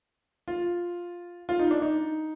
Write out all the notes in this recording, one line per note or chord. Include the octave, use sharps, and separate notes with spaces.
F4
F4
D#4
D4
D#4